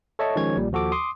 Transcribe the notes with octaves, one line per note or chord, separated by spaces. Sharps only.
A4 C#5 D#5 E5 A5 C#6
D#3 F3 G#3 C#4 C#5 G#6
A#1 A#2 G3
D#2 F3 F#4 A4 D6
C6 D6 D#6